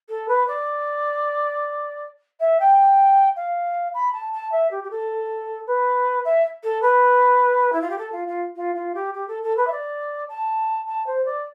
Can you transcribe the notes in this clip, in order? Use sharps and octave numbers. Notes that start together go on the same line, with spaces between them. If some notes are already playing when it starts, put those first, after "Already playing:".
A4
B4
D5
E5
G5
F5
B5
A5
A5
E5
G4
G4
A4
B4
E5
A4
B4
E4
F4
G4
A4
F4
F4
F4
F4
G4
G4
A4
A4
B4
E5
D5
A5
A5
C5
D5